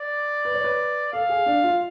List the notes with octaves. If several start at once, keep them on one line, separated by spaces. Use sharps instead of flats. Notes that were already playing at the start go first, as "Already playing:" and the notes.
Already playing: D5
B4
C#5
B4
A4 F5
G#4
D4
F4